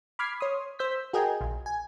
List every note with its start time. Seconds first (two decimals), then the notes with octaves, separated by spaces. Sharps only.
0.19 B5 D6 F6 G#6 B6 C7
0.40 C#5 C6 D#6
0.79 C5 E6 G6 B6
1.13 F#4 G#4 A#4 D#5 G5 G#5
1.41 A#1
1.66 G#5